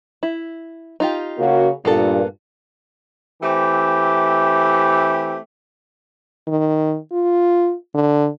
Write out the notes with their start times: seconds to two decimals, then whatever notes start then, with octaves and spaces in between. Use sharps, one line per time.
0.23 E4
1.00 D#4 F4 G4
1.38 C#3 A#3 F#4
1.85 G2 A#2 A#3 B3 A4
3.42 E3 A3 C4 G4
6.48 D#3
7.12 F4
7.95 D3